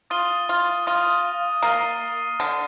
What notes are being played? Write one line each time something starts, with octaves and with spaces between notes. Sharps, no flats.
F4 D#6 A6 D#7 G7
F4
F4 D#6 A#6 D#7
A#3 F6 A6 C7 D#7 G7
D3 F6 A6 D#7